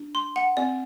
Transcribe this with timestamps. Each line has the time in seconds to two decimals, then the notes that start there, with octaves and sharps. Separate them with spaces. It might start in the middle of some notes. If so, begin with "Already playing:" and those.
Already playing: D4
0.15 C6
0.36 F#5
0.57 C4 D5